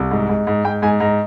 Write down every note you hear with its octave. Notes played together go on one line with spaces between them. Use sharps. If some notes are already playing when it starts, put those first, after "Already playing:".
Already playing: C2
G#2
G#2
G#2
G#2 G5
G#2 G#5
G#2 A#5